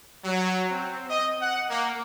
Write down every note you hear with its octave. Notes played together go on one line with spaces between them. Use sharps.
F#3
C4
D#5
F#5
A#3